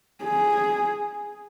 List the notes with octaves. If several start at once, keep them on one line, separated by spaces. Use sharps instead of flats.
G#4